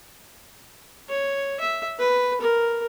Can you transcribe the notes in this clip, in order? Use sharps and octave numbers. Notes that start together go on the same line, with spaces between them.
C#5
E5
B4
A#4